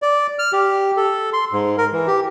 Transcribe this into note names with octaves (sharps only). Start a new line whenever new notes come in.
D5
F6
G4
A4
C6
G#2
A#4
E3
G4